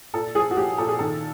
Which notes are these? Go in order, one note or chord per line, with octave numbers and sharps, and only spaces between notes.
A#2 A4
F3 G#4
F#4
F3 G4
A#2 A4
G#4
D#3 A4